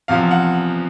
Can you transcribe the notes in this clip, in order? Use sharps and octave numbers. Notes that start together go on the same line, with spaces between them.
E2 C3 F3 F5
F#5